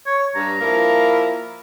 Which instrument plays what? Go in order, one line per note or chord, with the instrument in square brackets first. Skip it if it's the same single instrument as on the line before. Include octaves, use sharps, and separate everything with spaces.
[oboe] C#5
[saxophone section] G2 [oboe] A#5
[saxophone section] F3 A#3 E4